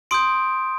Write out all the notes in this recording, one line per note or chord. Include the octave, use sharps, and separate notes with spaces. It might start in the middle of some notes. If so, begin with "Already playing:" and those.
C6 D#6 G6 D7